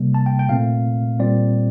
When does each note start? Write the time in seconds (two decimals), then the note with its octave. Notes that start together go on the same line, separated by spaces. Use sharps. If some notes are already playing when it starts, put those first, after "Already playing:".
Already playing: C3 G3 A#3
0.14 A5
0.26 G5
0.39 G5
0.49 A#2 A3 C4 F5
1.20 A#2 G3 C4 D5